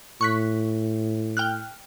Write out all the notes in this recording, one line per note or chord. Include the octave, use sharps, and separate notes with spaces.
A2 C#6 F#6 B6
G5 F6 F#6